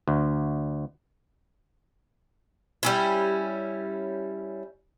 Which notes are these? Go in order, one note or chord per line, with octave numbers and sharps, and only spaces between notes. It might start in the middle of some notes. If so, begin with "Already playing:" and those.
D2
G3 C#4 E4